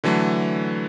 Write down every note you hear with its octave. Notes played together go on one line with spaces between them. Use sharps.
D3 E3 F#3 A3